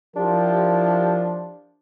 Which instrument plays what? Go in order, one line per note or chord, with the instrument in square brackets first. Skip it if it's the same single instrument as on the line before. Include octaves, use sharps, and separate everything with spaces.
[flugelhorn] F3 [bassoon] D4 [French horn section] E4 G4 A#4